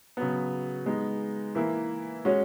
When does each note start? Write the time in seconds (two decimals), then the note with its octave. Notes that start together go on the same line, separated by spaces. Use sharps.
0.17 C#3 F#3 B3
0.86 G#3 B3 D#4
1.55 E3 A#3 E4
2.25 G#3 C#4 F#4 C#5